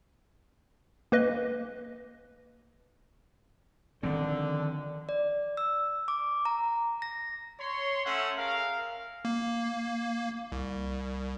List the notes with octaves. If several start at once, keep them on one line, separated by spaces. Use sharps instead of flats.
A#3 B4 D#5
D3 D#3 F3 C4
D5
E6
D6
A#5
A#6
C#5 C6
A3 C#4 A4 E5 F#5
G#4 A#4 F5
A#3
C2